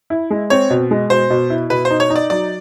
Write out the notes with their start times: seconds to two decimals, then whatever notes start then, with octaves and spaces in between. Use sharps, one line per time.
0.10 E4
0.30 G#3
0.50 C4 C#5
0.70 B2
0.91 G#3
1.10 B2 C5
1.30 B2
1.50 E4
1.70 B2 B4
1.85 C5
1.90 D#4
2.00 C#5
2.10 D#4
2.16 D5
2.30 F#3 D5